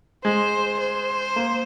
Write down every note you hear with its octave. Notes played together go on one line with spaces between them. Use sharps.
G#3 C5
C5
A#3